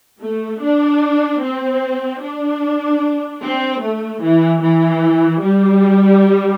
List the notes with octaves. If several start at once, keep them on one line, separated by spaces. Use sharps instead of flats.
A3
D4
C4
D4
C4
A3
E3
E3
G3